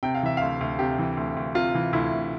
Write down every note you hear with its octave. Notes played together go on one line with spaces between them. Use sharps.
C3 G5
F5
E3 E5
D2 F5
D2
C3 G4
E3
D2
D2
C3 F4
E3
D2 E4
D2